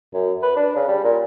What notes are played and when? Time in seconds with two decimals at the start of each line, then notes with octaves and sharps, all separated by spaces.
0.14 F#2
0.42 B4
0.56 D4
0.76 C#3
0.88 G3
1.04 A#2